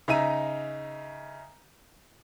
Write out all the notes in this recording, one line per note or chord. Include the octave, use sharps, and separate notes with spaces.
C#3 D#4 E5 A#5 D#7